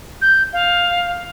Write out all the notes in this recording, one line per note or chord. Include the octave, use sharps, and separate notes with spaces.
G6
F5